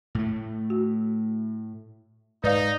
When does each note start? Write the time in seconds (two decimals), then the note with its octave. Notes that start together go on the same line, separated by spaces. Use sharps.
0.15 A2 A3
0.70 F#4
2.44 G#2 D#4 B4 D5 F5